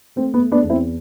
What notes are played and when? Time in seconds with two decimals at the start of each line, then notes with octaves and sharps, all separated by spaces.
0.16 A3 C4
0.34 B3
0.39 A3
0.52 B3 D4
0.63 E2
0.70 C4 E4